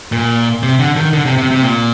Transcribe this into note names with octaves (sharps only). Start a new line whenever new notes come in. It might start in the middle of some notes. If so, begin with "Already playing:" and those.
A#2
C3
D3
D#3
D3
C3
C3
C3
A#2